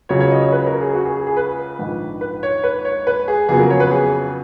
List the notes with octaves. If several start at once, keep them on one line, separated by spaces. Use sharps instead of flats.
C#2 C#3 F#3 C#5
C#5
D#5
C#5
B4
A#4
G#4
F#4
G#4
G#4
G#4
B4
A#1 G#2 D#3
B4
C#5
B4
C#5
B4
G#4
F2 C#3 F#3 B3 G#4
A#4
C#5
B4
G#4